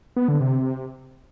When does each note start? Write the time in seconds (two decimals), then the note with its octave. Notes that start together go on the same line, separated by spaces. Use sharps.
0.17 B3
0.28 D3
0.40 C3